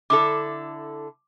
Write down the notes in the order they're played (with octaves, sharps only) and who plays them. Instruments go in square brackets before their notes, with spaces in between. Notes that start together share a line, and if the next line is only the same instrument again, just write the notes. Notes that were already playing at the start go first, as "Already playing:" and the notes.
[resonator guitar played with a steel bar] D3 E4 A4 [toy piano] D6